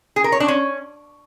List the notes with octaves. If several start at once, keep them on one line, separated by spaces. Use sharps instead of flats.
G#4
A#4
C#5
D4
C#4